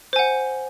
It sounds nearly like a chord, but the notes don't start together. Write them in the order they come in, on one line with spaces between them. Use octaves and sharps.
C5 G#5 F#5